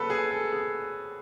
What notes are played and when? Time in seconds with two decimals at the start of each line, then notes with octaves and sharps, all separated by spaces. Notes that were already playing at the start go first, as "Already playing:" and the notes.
Already playing: D#2 C#3 F#3 A3 A4 B4
0.10 G#4
0.31 A4
0.52 G#4